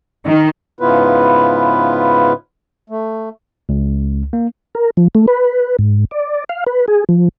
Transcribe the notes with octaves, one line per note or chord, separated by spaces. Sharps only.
D#3
G#2 C#3 B3 E4 F4 B4
A3
C#2
A#3
A#4
F3
A3
B4
G#2
D5
F5
B4
G#4
F3